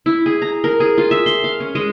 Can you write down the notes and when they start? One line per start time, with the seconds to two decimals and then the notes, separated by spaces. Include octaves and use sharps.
0.06 E4
0.26 G#4
0.42 A#5
0.64 A#4
0.80 G#4
0.98 F4
1.11 E5
1.26 C6
1.44 F5
1.60 C#4
1.75 G#3